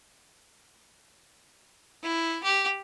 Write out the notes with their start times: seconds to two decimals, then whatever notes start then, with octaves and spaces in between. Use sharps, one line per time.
2.03 E4
2.44 G4